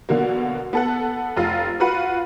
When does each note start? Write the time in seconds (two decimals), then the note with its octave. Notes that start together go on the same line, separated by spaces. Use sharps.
0.09 B2 D3 F#3 A#3
0.73 B3 A4 F#5
1.36 F1 F4
1.80 F4 F#4 B4 F#5